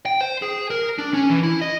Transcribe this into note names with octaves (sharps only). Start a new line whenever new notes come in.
G5
C5
G#4
A#4
D4
C#4
E3
E4
D#5